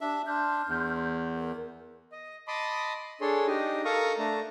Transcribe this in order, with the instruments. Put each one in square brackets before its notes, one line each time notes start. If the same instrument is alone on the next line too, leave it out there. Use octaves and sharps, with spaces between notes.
[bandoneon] D4 E5 [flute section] G4
[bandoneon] D4 [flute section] C6 F6 G6
[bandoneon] E2
[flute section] A#4
[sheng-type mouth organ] D#5
D#5 A5 B5 C6 D6 D#6
D4 G#4 A4 C#5 C6
D4 D#4 G4 D#5
A4 A#4 F5 A#5 C#6 D#6
A3 D4 A5 A#5